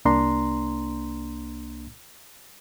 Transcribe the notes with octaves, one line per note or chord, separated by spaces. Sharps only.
C2 A#3 D4 A#5 C6